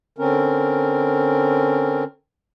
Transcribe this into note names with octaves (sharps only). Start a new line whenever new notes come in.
D3 C4 C#4 A#4